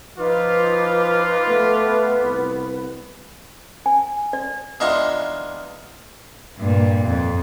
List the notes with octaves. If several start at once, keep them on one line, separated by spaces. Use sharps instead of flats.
F3 D#4 F4 B4 D6 F6
A3 B3
C2
G#5
D5
E2 G#3 D4 D#4 F4 C#6
G2 A#2
F2